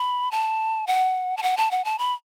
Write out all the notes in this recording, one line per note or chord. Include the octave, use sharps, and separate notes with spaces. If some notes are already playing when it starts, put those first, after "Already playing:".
Already playing: B5
A5
F#5
A5
F#5
A5
F#5
A5
B5